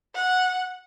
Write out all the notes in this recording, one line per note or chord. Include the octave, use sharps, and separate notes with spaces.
F#5